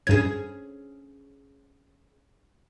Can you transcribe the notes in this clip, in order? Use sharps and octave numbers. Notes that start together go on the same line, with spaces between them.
G2 C#4 G#4 G#6